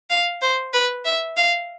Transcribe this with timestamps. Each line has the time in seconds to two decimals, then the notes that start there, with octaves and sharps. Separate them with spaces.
0.10 F5
0.42 C5
0.73 B4
1.05 E5
1.37 F5